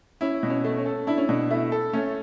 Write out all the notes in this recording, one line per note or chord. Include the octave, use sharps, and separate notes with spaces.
C#4 E4
B2
C#4
A3
C#4
A4
D4 E4
C#4
B2 D4
A3 E4
A4
A3 C#4